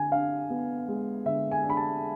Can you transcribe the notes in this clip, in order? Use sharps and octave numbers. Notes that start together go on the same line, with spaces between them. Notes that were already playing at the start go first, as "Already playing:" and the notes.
Already playing: D3 G#5
D4 F5
B3
G#3
D3 E5
G#5
D4
B5
A5